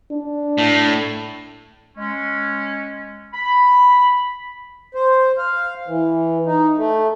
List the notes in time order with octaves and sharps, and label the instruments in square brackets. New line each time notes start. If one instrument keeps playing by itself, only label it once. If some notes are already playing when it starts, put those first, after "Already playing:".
[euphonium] D4
[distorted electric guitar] A2
[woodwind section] G#3 C#4
B5
[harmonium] C5
F5
E3
D#4
A3